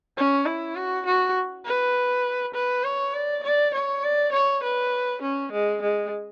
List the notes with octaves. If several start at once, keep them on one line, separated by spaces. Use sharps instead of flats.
C#4
E4
F#4
F#4
B4
B4
C#5
D5
D5
C#5
D5
C#5
B4
C#4
G#3
G#3